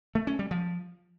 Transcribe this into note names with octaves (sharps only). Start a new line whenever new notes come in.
A3
C#4
G3
F3